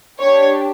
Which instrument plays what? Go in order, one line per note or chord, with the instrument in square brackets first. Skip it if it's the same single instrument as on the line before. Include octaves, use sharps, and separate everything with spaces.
[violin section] D4 G4 C#5